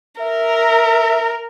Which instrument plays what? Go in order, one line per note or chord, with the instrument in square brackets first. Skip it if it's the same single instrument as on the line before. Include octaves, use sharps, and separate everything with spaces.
[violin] A#4 [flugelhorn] E5